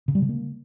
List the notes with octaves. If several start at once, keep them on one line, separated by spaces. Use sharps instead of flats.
C#3
G3
C#3
A#3